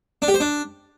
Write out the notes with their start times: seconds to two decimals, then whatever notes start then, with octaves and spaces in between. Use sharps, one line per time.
0.22 D4
0.28 G4
0.34 C5
0.40 D4